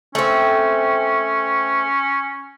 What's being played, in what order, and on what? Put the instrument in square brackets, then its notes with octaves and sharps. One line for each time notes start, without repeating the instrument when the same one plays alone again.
[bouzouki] A3 C4 [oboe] C#4